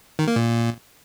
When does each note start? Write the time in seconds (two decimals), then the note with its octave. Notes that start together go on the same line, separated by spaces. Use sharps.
0.19 D#3
0.28 A#3
0.36 A#2